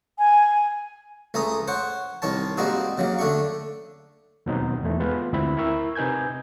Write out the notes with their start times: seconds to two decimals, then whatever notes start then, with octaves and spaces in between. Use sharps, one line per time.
0.18 G#5
1.34 C#2 A3 G#5 A#5 D#6
1.68 C5 C#5 F#5
2.22 C2 D#3 C#5 A5
2.57 G3 G#3 A#3 C4 D#4 F#4
2.98 C#3 F#3 A#3
3.19 D3 A3 D4 C#6
4.46 D#2 B2 F#3 C4 D#4
4.83 E2 A3
5.00 G#3 B3 F4 B4
5.33 D2 C4 E4 B5
5.57 E4 A#4 C#6 E6
5.95 C3 D#4 B4 G#5 G6 G#6